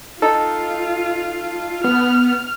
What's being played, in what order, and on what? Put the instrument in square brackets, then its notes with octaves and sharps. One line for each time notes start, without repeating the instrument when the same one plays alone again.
[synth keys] D#4 A4 [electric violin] F4
[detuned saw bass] B3 [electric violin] F6